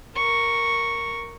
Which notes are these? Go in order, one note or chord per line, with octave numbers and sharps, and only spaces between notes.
A#4 C#6